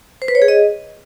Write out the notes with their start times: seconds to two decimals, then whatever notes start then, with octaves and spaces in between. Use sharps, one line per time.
0.22 C5
0.28 B4
0.35 C#5
0.42 G#4
0.48 D#5